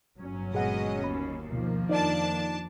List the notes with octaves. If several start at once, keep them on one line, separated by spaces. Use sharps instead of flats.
G1 F#3 C#4
A#2 G#3 B3 G#4 D#5 F#5
D#2 B5
D2 B2 D#3 F3 A#3
F2 D4 D#4 D5 A5